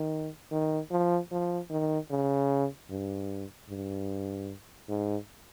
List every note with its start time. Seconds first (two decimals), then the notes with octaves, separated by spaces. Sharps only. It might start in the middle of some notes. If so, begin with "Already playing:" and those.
Already playing: D#3
0.52 D#3
0.91 F3
1.32 F3
1.71 D#3
2.10 C#3
2.90 G2
3.69 G2
4.89 G#2